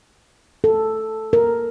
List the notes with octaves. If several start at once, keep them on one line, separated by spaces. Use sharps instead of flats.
A4
A#4